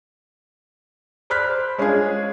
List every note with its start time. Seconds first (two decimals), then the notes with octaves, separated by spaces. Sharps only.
1.30 C5 D5 B5 F6 F#6 B6
1.78 G#3 C#4 D4 F4 G#4